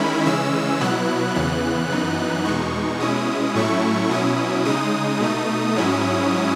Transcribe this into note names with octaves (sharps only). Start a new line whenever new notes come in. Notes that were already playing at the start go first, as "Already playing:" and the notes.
Already playing: D#3 G#3 C#4 E4 B5
C#3 E3 G#3 C#4 E6
B2 F#3 B3 E4 F#6
E2 C#3 E3 B3 F#6
F#2 E3 B3 D#4
E2 B2 G#3 D#4 C#6
B2 G#3 C#4 E4 D#6
A2 F#3 A3 C#4 E4 C#6
B2 F#3 C#4 E4 D#6
C#3 G#3 D#4 D#6
B2 A3 D#4
G#2 F#3 C#4 E4